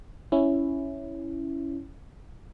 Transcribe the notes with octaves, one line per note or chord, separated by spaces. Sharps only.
C#4 E4